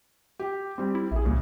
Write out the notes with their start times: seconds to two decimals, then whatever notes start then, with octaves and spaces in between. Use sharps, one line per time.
0.39 G4
0.78 G3 C4
0.95 E4
1.11 A#1 E4 G#4
1.25 C2 A#2 C#3 F3